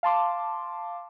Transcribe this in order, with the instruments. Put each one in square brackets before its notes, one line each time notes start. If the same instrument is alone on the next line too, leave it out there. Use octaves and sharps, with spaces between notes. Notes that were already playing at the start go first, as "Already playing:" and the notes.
[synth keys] F5 A5 C6 D6